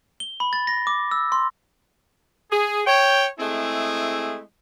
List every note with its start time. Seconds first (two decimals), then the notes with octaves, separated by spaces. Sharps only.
0.20 G7
0.40 B5
0.53 A6
0.67 A#6
0.87 D6
1.11 E6
1.32 C6
2.51 G#4
2.86 C#5 G5
3.39 G#3 A3 C4 E4 G#4